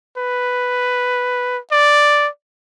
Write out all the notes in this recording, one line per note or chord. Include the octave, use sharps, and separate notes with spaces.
B4
D5